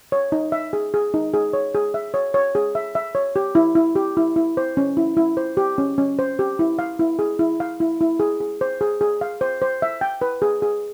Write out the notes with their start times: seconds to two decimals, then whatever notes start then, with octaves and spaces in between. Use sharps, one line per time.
0.12 C#5
0.32 D#4
0.52 E5
0.73 G#4
0.94 G#4
1.14 D#4
1.34 G#4
1.53 C#5
1.75 G#4
1.94 E5
2.14 C#5
2.34 C#5
2.55 G#4
2.75 E5
2.95 E5
3.15 C#5
3.36 G4
3.55 E4
3.75 E4
3.95 G4
4.17 E4
4.36 E4
4.57 C5
4.77 C#4
4.97 E4
5.17 E4
5.37 C5
5.57 G4
5.78 C#4
5.98 C#4
6.19 C5
6.39 G4
6.59 E4
6.79 F5
6.99 E4
7.19 G#4
7.39 E4
7.60 F5
7.80 E4
8.01 E4
8.20 G#4
8.40 G#4
8.61 C5
8.81 G#4
9.01 G#4
9.21 F5
9.41 C5
9.62 C5
9.82 E5
10.01 G5
10.22 B4
10.42 G#4
10.62 G#4